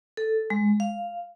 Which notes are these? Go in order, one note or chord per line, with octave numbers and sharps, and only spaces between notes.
A4
G#3
F5